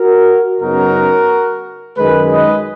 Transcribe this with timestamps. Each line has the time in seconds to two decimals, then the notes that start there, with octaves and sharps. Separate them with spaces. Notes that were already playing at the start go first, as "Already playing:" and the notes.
Already playing: F#4 A#4
0.60 F#2 C#3 F#3 B3 D#4 F#4 A#4
1.97 F#2 D#3 G#3 G#4 B4
2.32 B4 D#5